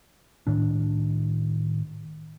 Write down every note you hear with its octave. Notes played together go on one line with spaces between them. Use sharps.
A2 D#3 D4